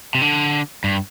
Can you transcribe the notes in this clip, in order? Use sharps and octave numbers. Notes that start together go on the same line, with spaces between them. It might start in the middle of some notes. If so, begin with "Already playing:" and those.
C3
D3
G2